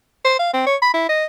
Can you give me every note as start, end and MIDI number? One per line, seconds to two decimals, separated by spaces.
0.25 0.34 72
0.39 0.53 77
0.54 0.65 60
0.67 0.76 73
0.82 0.89 83
0.94 1.06 64
1.09 1.25 75